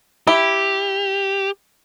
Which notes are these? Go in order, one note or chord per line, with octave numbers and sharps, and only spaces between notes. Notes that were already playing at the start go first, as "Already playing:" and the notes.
E4 G4